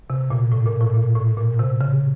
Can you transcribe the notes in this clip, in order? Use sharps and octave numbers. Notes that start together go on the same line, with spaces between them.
C3
A#2
A2
A#2
A2
A#2
A2
A#2
C3
C#3